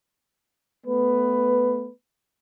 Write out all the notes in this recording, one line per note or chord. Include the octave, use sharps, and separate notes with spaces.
A3 B3 B4